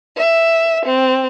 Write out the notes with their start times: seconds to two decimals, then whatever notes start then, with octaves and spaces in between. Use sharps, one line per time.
0.17 E5
0.85 C4